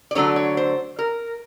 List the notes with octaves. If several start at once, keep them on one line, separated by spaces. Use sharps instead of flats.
D5
D3 F#3 A3 D4 C#5
C#5
C5
A#4